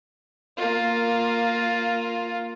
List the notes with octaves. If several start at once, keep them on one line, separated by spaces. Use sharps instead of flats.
A#3 F4